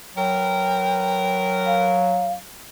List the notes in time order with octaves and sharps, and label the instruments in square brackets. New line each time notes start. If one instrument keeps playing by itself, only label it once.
[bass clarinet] F#3 [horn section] A#4 B4 [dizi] G5
[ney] F5